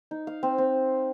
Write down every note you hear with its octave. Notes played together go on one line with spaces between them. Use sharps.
D#4
F5
C4
C4